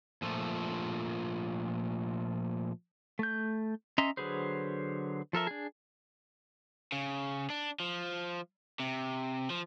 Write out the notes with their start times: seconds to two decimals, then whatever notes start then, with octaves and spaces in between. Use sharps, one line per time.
0.22 A#2 F3 A3
3.19 A3 G6
3.98 C#4 D#5 E5 A#5 C6
4.17 D3 F#3 G#4 B4 C5
5.33 F3 A4 A#4 E5
5.47 D4 G#4
6.92 C#3
7.50 D4
7.80 F3
8.80 C3
9.50 F3